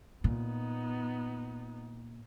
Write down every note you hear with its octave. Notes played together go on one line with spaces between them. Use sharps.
A#2 B3 D#4